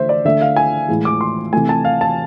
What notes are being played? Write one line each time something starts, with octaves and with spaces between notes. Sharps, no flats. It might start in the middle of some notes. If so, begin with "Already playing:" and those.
Already playing: D3 A3 C5 E5
D5
D3 A3 E5
F5
G#5
A2 E3 G#3
D6
C6
C3 E3 A3 G#5
A5
F5
A5